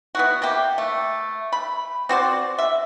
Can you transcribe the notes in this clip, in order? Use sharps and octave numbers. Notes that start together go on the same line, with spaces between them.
B3 E4 F#4
C3 A#3 G4
A3
B5
C4 F#4 C5 D5
E5